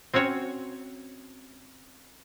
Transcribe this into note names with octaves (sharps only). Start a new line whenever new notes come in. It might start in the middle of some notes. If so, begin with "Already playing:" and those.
C4 C#4 F#4 C#5